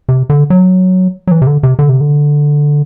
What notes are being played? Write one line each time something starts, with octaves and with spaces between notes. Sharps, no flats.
C3
D3
F#3
F#3
E3
C3
D3
C3
D3
C3
D3